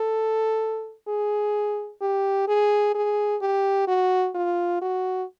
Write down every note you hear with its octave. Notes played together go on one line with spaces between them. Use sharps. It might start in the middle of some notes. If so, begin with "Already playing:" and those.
Already playing: A4
G#4
G4
G#4
G#4
G4
F#4
F4
F#4